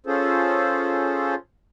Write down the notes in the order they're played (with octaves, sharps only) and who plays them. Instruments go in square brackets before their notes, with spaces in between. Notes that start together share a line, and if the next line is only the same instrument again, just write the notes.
[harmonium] C#4 F4 G#4 A4 C5